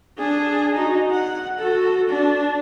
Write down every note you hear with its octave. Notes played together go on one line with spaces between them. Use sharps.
D4 G#4
D#4 F#4
F#5
F#4 A4
D4